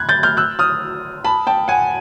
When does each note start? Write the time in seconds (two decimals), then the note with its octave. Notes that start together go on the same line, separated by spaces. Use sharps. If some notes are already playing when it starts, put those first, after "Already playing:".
Already playing: F#6 G#6
0.09 G6 A6
0.23 F6 G6
0.37 E6 F#6
0.59 D#6 F6
1.24 A5 B5
1.47 G5 A5
1.68 F#5 G#5